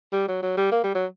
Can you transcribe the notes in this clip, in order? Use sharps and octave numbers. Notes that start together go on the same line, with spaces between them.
G3
F#3
F#3
G3
A#3
G3
F#3